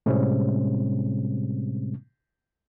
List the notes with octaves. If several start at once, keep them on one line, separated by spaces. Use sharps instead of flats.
A2 C3 G3 G#3 C4 C#4